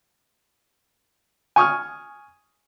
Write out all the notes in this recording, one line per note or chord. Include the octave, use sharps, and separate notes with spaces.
G#5 C#6 D#6 F6